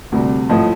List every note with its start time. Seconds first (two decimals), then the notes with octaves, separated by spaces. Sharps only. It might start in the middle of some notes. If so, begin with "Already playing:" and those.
0.12 D2 C3 G3
0.49 A2 F3 D#5